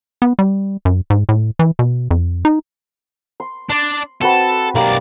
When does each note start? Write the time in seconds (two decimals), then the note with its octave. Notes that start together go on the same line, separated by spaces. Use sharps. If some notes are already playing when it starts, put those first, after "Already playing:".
0.22 B3
0.39 G3
0.85 F#2
1.10 G#2
1.29 A2
1.59 E3
1.79 B2
2.11 F2
2.45 D#4
3.40 C6
3.70 D4 D5
4.22 C4 F#4 A4 B4
4.75 B1 A#3 G4 A#4 D5